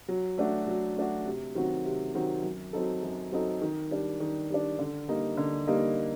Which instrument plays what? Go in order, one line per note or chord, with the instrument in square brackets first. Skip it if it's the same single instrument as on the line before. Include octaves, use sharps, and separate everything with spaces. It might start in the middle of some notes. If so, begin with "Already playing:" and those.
[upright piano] F#3
A3 D4 F#4
F#3
A3 D4 F#4
C3
D#3 F#3 C4 F#4
C3
D#3 F#3 C4 F#4
F#2
F#3 C4 D#4 A4
F#2
F#3 C4 D#4 A4
D#3
G3 D4
D#3
G3 D4
D3
G3 A#3 D#4
D3
G3 A#3 D#4